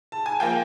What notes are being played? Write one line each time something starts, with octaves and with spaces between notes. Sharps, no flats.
A5
G#5
F3 A#3 G5